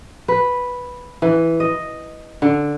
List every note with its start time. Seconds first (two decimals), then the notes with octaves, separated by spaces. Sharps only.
0.28 B4
1.22 E3
1.60 D#5
2.42 D3